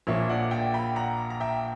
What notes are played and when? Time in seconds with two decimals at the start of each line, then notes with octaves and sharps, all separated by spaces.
0.07 A#1 A#2 A#3 C#5 E5
0.29 D5 F#5
0.51 E5 G5
0.74 G5 B5
0.96 F#5 A#5
1.30 A#5
1.40 E5 G5